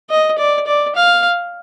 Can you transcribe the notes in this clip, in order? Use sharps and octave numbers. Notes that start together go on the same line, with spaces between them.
D#5
D5
D5
F5